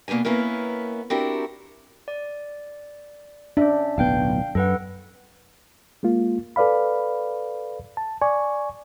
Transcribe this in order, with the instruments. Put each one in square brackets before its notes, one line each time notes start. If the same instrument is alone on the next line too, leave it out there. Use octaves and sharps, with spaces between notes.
[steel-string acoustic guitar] B2 A#3 B3 D4 G#5
A#3 B3 C#4 E4 A#4
C4 D4 E4 F#4 G4 A#4
[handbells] D5
[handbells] C#4 E5 [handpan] D4
[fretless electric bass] D1 B1 B3 [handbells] F5 G5 G6
[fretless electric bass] F#2 [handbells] A4 B4 F#5
[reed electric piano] G#3 A#3 F4
A4 B4 D5 F5 B5
A5
D5 G#5 C#6